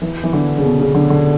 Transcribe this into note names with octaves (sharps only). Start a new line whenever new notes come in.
E3
E3
D3
C#3
B2
C#3
D3
D3